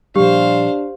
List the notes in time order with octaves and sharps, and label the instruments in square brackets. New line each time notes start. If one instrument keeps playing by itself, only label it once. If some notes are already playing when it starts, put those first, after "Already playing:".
[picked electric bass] A#2 F3 G3 [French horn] D4 [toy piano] G4 [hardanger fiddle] C5 F5